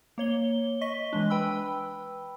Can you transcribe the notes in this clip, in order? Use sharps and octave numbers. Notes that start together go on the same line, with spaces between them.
A#3 C#5 G7
D#5 C#6 B6 G7
E3 G#3 D4
B4 G5 B5 E6